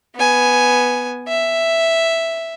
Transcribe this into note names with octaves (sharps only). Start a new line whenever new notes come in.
B3 G#5
E5